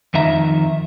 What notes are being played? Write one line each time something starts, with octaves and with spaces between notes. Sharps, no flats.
F2 D#3 E5 A#5